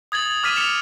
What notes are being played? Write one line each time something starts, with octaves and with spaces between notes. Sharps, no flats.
D#6 G#6 A6 F#7
D6 F6 A6 B6 D#7 E7
F6 C#7 E7 F7